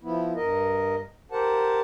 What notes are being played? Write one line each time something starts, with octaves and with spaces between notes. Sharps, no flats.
F3 B3 E4
G2 A#4 D#5
G4 A#4 C5 F#5 A5